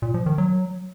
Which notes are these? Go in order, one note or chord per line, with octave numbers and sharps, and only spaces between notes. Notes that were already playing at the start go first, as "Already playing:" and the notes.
A#2
F3
D#3
F#3